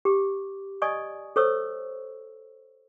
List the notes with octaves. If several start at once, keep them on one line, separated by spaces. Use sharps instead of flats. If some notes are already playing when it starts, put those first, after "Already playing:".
G4 D6
D5 D#5 G#5 C#6 D#6
A4 C5 C#5 C#6 E6